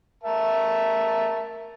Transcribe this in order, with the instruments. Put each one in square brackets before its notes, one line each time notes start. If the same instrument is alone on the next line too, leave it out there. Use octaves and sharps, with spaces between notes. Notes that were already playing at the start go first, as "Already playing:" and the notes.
[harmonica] A#4 E5 A5